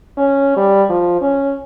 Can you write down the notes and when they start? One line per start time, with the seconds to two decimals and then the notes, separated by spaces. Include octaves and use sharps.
0.18 C#4
0.57 G3
0.90 F3
1.21 C#4